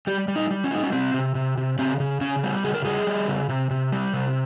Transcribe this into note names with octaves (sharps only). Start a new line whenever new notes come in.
G3 G4
G3
D#4
G3
C#4
G3 D#4
C#4
C3 C4
C3
C3
C3
C#3 C4
C#3
C#3 C#4
G3
C#3 G#4
A#4
G3 G#4
G3
C#3
C3
C3
G3
C3